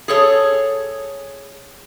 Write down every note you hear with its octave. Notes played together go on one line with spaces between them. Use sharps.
G#4 A4 C#5